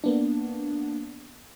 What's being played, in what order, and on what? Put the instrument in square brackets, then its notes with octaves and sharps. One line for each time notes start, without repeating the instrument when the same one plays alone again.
[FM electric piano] A#3 B3 D4